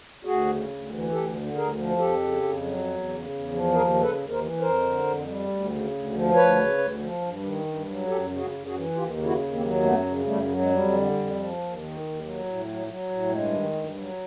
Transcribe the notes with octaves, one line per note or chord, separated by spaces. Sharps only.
D2 F#4 G#4
C#3
D2
E3
D2 G4 A4
D3
D2 G#4 A#4
F3
F2 G4 A4
C#3
F2
F#3
E2
C#3
E2
F3
D#2 G#4 A#4
C#3
A4 B4
D#2
A#4 C5
E3
F2 A#4 C5
D3
F2
G3
D2
C#3
D2
F3
D2 B4 C#5
C#3
D2
F3
G2
D#3
G2
F#3
F#2 G4 A4
C#3
F#4 G#4
F#2
F#4 G#4
E3
D#2 F4 G4
C#3
E4 F#4
D#2
A#3 C4
F#3
F#2 A3 B3
C#3
F#2 G3 A3
F#3
G#3
F2 G3
D3
F2
F3
D#2
D#3
D#2
F#3
A2
F#3
F#3
A2
G2 G#3
D#3
G2
F#3